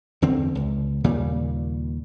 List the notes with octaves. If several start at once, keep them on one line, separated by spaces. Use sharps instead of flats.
E2 D3 C4
C#2
D#2 A#2 C#3 G3